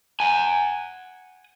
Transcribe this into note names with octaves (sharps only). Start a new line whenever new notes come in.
F#5 G#5